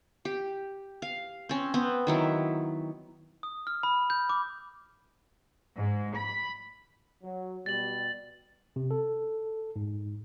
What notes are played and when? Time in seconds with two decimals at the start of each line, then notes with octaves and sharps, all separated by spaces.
0.25 G4
1.02 F5
1.49 C4 C#4
1.74 B3 C4
2.07 D#3 F#3 E4
3.43 D#6
3.67 F6
3.83 B5
4.10 G6
4.29 D6
5.77 G#2
6.17 B5
7.23 F#3
7.66 B2 G3 A6 F#7
8.76 C3
8.91 A4
9.76 G#2